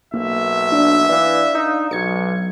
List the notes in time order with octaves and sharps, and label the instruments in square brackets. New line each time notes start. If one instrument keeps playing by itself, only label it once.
[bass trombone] B1 [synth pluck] A#3 [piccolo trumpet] E5
[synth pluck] D4
[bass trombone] E3 [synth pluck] D5 F5
[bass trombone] D#4
[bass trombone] B1 [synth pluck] F#3 G#6 C#7